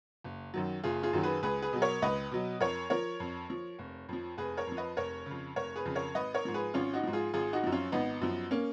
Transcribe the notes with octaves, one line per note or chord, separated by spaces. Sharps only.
F#1
F#2 D#3 F#3
F#1 F4 G#4
F4 G#4
F#2 D#3 F#3
G#4 B4
C#2 G#4 B4
G#4 B4
B2 F#3
A#4 C#5
C#2 B4 D#5
B2 F#3
F2 A#4 C#5
F3 A#4 C#5
F2
F3
F1
F2 F3
F1 G#4 B4
A#4 C#5
F2 F3
B4 D#5
F1 A#4 C#5
F2 C#3
F1 A#4 C#5
G#4 B4
F2 C#3
A#4 C#5
G#1 B4 D#5
A#4 C#5
G#2 F3
G#4 B4
G#1 C#4 F4
D#4 F#4
G#2 F3
F4 G#4
G#1 F4 G#4
D#4 F#4
F#2 F3
C#4 F4
G#1 B3 D#4
F#2 F3
A#3 C#4